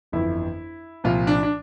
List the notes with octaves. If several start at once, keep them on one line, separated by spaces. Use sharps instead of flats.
G1 F2 E3 E4
C2 A#2 F3 F4
D4
D4